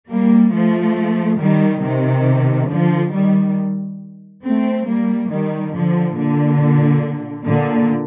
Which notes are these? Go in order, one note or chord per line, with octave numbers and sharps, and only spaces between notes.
G3 A#3
F3 A3
D#3 G3
C3 D#3
D3 F3
D#3 G3
A3 C4
G3 A#3
D#3 G3
D3 F3
A#2 D3
A#2 D3